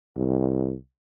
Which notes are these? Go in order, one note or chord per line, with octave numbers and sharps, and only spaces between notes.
C2